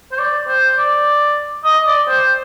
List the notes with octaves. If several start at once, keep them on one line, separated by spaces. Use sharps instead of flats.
C5
D5
C5
D5
D#5
D5
C5